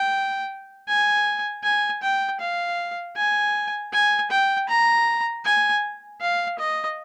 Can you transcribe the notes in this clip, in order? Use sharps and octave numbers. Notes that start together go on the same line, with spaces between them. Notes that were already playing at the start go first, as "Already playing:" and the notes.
Already playing: G5
G#5
G#5
G5
F5
G#5
G#5
G5
A#5
G#5
F5
D#5